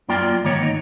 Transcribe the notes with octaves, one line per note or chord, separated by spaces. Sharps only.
F#2 A#3 F4 D5 G5
G#2 D#3 A#3 C#5
D#4